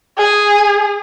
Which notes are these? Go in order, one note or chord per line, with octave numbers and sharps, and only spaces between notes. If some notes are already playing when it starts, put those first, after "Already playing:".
G#4